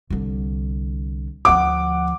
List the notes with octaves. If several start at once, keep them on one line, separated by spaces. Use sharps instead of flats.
C2 D3
D2 F3 F#5 D6